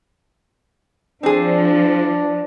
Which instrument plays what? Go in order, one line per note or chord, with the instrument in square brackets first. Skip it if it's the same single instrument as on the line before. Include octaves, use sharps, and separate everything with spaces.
[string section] F3 [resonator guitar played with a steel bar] C4 G#4 [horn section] D4